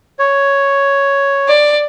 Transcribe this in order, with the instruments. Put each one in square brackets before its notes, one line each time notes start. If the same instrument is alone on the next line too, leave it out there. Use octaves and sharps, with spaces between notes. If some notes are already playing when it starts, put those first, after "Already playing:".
[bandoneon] C#5
[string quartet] D5